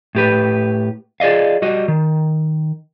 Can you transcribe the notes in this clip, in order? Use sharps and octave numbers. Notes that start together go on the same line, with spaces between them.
A2 G4 B4
F4 G#4 D5 D#5 F5
G3 F#4 D#5
D#3